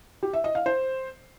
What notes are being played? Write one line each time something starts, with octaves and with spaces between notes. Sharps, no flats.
G4
E5
D#5
F5
C5